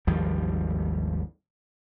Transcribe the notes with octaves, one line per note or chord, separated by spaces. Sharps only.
G#1 D#2 F3 G3